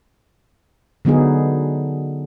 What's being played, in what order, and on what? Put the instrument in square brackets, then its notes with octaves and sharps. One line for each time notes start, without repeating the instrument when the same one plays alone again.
[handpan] D3 F#3 B3 D#4 G#4